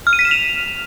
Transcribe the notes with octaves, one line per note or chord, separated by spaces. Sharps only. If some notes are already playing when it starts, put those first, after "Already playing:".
F6
D#7
B6
E7
F7